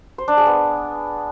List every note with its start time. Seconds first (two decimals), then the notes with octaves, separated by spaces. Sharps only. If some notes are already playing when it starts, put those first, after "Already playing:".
0.18 C5
0.28 D4
0.37 G#4
0.47 B3